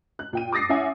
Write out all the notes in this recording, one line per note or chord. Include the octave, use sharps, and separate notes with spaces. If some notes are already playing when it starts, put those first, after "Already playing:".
F#6
A#2 G5 D#7
D6 D#6 A6 A#6 C7
C#4 E4 E5 F#5 G#5